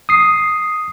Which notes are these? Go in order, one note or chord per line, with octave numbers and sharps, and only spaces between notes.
D#6 C7